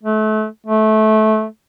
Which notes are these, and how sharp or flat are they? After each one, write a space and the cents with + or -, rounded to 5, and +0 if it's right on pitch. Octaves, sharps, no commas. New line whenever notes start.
A3 -30
A3 -20